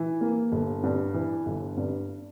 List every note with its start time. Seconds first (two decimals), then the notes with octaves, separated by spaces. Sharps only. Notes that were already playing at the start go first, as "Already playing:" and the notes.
Already playing: E3
0.21 A#3
0.52 G1
0.83 G2
1.14 E3
1.46 G1
1.77 G2